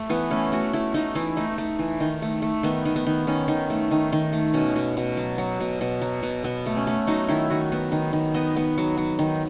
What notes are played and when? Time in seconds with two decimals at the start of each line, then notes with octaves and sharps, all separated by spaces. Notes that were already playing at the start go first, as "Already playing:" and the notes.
Already playing: A3
0.10 E3 B3
0.31 A3 C#4
0.52 A3 F#4
0.73 A3 E4
0.94 A3 D#4
1.15 E3 E4
1.37 A3 D#4
1.58 A3
1.79 E3
2.00 D#3
2.22 A3
2.42 A3
2.63 D#3 B3
2.85 D#3
2.96 B3
3.06 D#3
3.27 D#3 C#4
3.48 D#3
3.70 A3
3.91 D#3
4.12 D#3
4.33 A3
4.54 B2 C#4
4.76 B2
4.97 B2
5.17 F#3
5.38 F#3
5.60 B2
5.81 B2
6.02 F#3
6.23 B2
6.44 B2 B3
6.66 A3
6.77 C#4
6.87 A3
7.07 F#3 D#4
7.28 D#3 E4
7.50 D#3 F#4
7.72 B3
7.92 D#3
8.13 D#3
8.34 B3 D#5
8.56 B3
8.78 F#3
8.97 F#3
9.19 D#3